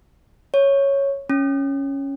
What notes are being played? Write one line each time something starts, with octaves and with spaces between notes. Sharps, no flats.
C#5
C#4